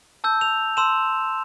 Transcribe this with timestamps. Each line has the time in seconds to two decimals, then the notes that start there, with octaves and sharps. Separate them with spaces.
0.24 A5 E6 G6
0.41 F7
0.77 A5 C6 E6 E7